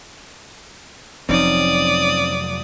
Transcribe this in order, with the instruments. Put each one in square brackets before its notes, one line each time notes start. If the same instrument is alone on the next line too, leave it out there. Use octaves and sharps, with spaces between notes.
[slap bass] F1 F3 F#3 [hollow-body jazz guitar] C4 C#4 D#4 [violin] D5 D#6